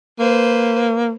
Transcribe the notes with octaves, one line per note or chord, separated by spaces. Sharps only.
A#3 B4 C5